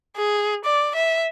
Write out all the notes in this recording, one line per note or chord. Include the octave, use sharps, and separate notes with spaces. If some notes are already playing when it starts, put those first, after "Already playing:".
G#4
D5
E5